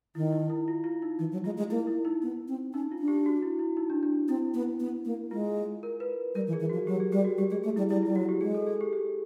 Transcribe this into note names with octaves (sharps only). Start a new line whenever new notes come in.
D#3 E4
D#4
E4
F4
F4
D#4
E3 D#4
F#3
G#3 F4
G#3
A#3 E4
E4
D#4
B3
C4
C#4 D#4
F4
D4
G4
F#4
E4
E4
D#4
D4
D4
C4 E4
B3
B3
A#3
G#3 F4
A#4
B4
G3 A#4
E3
G#4
E3
F3 F#4
F#3 G4
G#4
G3 G4
F#4
G3 G4
G#3 G#4
A3 G#4
G3 E4
G3 E4
G3 F4
F#3 F#4
G4
G#3 G#4
A4
G#4
G4
G4